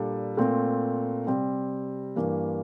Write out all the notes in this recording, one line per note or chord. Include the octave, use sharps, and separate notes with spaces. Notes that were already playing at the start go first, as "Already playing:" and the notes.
Already playing: A#2 G3 D4 A4
A#2 A3 C4
C3 G3 C4
G2 E3 A#3